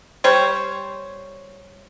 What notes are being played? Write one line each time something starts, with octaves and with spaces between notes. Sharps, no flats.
G3 C5 C#5